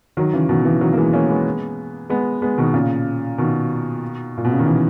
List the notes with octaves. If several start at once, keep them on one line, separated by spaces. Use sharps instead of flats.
D#3 F#3
C#3 E3
B2 D#3
C#3 E3
D#3 F#3
A#3
E3 G#3
A#3 C#4
G#3 B3
G#3 B3
G#3 B3
B2 D#3
A#2 C#3
B2 D#3
A#2
B2
C#3
D#3
C#3 E3